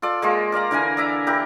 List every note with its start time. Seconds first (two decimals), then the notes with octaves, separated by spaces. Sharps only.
0.02 F4 A4 D5
0.22 G#3 A#3 F4
0.52 A#4 D5 F5 A#5
0.71 D3 E3 A#4 G#5
0.97 D5 E5 A#5
1.27 E4 G4 A#4